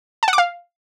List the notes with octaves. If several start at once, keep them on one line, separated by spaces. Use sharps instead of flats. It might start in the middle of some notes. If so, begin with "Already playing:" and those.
A5
F#5
D6
F5